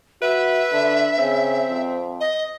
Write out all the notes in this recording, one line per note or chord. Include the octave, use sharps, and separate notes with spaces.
F#4 B4 E5
D3
C#3 C4
F2
D#5